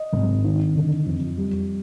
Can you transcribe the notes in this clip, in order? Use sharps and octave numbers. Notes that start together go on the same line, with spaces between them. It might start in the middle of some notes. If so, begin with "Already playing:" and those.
Already playing: D#5
G#1
D#3
D3
F2
G3